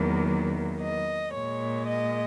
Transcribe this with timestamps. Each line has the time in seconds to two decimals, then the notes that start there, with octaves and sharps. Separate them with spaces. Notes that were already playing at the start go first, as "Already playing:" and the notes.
Already playing: E2 D#3 F#3 A#3
0.81 D#5
1.34 A#2 G#3 C#5
1.87 D#5